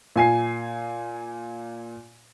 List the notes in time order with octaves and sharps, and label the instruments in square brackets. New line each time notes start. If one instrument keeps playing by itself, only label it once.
[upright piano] A#2 G#5 C7